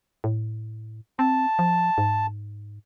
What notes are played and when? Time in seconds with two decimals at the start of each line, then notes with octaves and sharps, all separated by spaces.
0.24 A2
1.19 C4 A5
1.59 F3
1.98 G#2